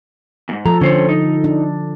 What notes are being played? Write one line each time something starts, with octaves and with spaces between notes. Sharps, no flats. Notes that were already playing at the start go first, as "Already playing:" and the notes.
E2 G#2
F3 A4 A#5
D3 C#4 C5 C#5
D#4
D4